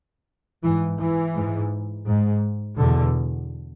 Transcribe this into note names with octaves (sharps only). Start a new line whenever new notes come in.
G#2 E3
E3
G#2
G#2
E2 B2 D3